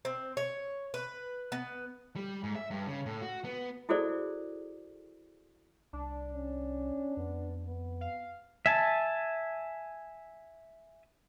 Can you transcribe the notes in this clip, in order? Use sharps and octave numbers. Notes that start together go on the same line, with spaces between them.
C4
C#5
B4
B3
G3
G#2
E5
G2
C#3
A2
F#4
B3
E4 F#4 G#4 A4 C5 D5
C2 D4
C#4
F2 B3
B3
F5
E5 G#5 A5